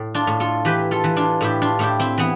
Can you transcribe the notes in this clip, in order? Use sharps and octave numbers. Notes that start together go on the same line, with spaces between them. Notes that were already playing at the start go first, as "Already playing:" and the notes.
Already playing: A2
D4 F4
A2
F4 A4
E3 G4 B4
F4 A4
E3
D4 F4
A2 E4 G4
D4 F4
A2 E4 G4
C4 E4
E3 B3